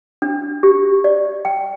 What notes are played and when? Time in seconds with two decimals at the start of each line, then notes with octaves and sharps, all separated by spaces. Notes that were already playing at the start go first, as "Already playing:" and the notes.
0.22 D4
0.63 G4
1.04 D5
1.45 G5